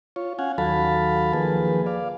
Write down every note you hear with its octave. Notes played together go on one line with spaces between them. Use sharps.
F4 C#5
C#4 F5 F#5 G#5
D#2 F#3 A4 F5 A5 B5
D#3 F3 A#3 G#4 B4
D5 F5